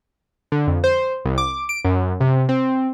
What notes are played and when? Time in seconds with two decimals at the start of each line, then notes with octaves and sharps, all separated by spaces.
0.52 D3
0.67 F2
0.84 C5
1.25 C2
1.38 D6
1.69 D7
1.85 F#2
2.21 C3
2.49 C4